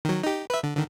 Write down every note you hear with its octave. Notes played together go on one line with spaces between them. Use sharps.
D#3 F#3
D#4 G4
B4 E5
D3
D3 D#3